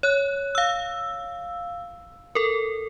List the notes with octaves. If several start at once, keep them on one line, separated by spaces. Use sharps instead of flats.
C#5 F#6
F5 E6
A4 A#4